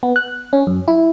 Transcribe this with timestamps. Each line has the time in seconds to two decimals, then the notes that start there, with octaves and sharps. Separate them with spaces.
0.03 B3
0.16 F#6
0.53 C#4
0.67 F#2
0.88 E4